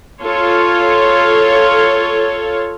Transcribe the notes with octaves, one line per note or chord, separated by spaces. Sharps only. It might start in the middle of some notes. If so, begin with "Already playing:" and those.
F4 A4 C#5